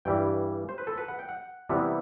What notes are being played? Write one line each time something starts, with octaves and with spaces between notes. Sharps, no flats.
G2 E3 G3 G5
C5
B4
A4
B4
F#5
G5
F#5
C3 E3 G3 B3